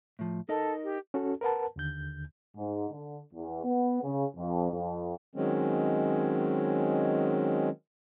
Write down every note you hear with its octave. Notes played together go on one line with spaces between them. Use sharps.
A2 F3
D#4 A4 A#4 D#5
G4
C#4 F#4 A4
A#4 B4 F#5 A5
D#2 D3 G6
G#2
D3
E2
B3
C#3
F2
F2
D#3 F#3 G#3 C4 C#4